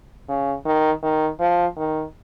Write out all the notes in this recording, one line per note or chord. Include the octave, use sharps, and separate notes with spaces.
C#3
D#3
D#3
F3
D#3